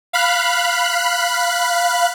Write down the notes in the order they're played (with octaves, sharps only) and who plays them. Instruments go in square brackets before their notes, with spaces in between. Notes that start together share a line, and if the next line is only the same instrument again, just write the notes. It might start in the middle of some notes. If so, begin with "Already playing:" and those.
[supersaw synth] F5 B5 F#6